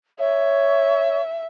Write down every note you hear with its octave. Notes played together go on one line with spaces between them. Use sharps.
C#5 E5